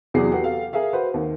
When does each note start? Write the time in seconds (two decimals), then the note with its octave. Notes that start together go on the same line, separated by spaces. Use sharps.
0.14 E2 C3 F#3 G#4 D5 C7
0.32 F#4 G4 A4 B4 F#5 G5
0.43 A4 F5
0.73 G#4 A#4 E5 F5
0.93 F#4 B4 C5 F#5
1.14 D#2